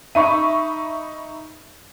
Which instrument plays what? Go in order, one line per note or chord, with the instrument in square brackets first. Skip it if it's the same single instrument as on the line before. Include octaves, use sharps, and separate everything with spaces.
[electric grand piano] D#4 D#7 [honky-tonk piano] E5 B5 C#6